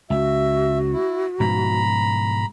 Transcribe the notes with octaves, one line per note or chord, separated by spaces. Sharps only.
C#2 F#4 E5
E4
G#2 B2 F3 A#5 B5